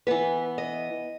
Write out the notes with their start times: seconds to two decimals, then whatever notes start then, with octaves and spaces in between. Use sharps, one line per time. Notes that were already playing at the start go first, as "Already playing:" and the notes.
0.07 E3 B3 B4
0.58 D#5